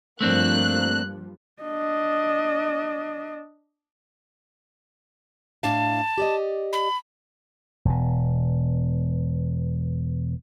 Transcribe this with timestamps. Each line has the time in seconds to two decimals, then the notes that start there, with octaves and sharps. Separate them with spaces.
0.21 G2 F3 G3 A3 A#3 C4 D4 F#6
1.63 D4 D#5
5.63 A2 D4 F5 A5
6.18 G4 D5 D#5
6.73 B5
7.85 E1 B2